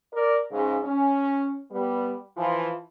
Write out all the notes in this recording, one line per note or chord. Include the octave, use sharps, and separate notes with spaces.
A#4 D5
G#2 C#3
C#4
G3 B3
E3 F3